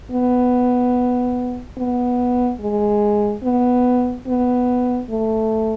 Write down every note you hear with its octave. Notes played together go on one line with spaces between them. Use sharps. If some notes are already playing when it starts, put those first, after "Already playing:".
B3
B3
G#3
B3
B3
A3